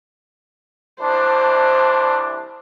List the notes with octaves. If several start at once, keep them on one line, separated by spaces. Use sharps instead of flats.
C2 E3 D4 C5